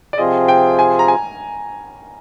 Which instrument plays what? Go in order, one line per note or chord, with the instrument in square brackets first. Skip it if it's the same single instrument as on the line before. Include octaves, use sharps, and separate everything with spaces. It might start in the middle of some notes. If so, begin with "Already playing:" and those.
[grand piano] D5
[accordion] C3 F3 C4 F4 G#4 [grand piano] D#5
[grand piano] G5
G#5
A#5
G#5